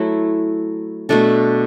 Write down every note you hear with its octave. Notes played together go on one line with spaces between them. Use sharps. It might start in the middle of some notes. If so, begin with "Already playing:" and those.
Already playing: F#3 A3 E4
B2 A3 D4 A4